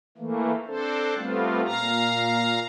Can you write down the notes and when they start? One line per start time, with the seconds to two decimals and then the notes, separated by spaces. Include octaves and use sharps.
0.18 E3 A3 A#3
0.66 C4 D4 A4 C5
1.16 G3 A3 B3 C4 F4
1.64 A#2 F5 A#5